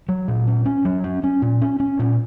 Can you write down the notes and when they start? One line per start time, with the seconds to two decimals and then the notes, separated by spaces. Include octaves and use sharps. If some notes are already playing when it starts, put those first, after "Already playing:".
0.09 F#3
0.28 A#2
0.48 C#4
0.66 C#4
0.85 F#3
1.04 C#4
1.23 C#4
1.42 A#2
1.62 C#4
1.80 C#4
1.99 A#2